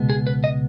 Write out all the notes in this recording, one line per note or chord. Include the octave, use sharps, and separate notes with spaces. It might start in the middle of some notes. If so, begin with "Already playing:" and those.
Already playing: C#2 B2 G#3 B3
G#4
B4
D#5